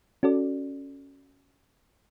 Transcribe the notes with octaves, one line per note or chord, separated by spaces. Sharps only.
C#4 F#4 A4 D5